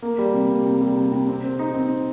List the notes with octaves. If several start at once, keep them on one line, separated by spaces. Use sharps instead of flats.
A#3
G3
C3
A#3
C3
G3
C3
C3
C4
C4
D#4
C4